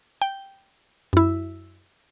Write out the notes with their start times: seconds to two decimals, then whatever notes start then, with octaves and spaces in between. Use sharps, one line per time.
0.22 G5
1.13 F#2 E4